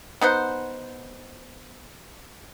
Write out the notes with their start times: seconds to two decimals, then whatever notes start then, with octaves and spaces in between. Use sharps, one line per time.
0.21 B3 D#4 C5 F#5